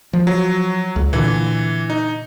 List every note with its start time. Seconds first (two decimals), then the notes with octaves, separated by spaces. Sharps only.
0.13 F3
0.27 F#3
0.96 C#2
1.13 A#2 D3 E3
1.90 D#4